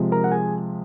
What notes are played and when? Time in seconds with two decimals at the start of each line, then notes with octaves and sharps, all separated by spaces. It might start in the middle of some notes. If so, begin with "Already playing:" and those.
Already playing: C3 F3 G#3
0.12 A#4 A#5
0.24 F#5
0.32 G#4 G#5